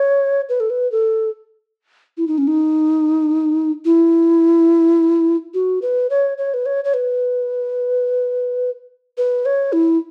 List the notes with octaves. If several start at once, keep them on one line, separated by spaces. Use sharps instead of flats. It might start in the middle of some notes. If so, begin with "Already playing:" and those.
Already playing: C#5
B4
A4
B4
A4
E4
D#4
C#4
D#4
E4
F#4
B4
C#5
C#5
B4
C#5
C#5
B4
B4
C#5
E4